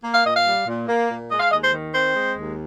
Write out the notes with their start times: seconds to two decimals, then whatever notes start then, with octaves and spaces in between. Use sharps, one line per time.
0.03 A#3
0.14 F5
0.26 A#2 D#5
0.36 F5
0.46 G3
0.67 A#2
0.89 A#3
1.10 A#2
1.30 G#3 D#5
1.40 F5
1.51 D#2 D#5
1.62 C5
1.74 D#3
1.94 C4 C5
2.16 G#3
2.36 D#2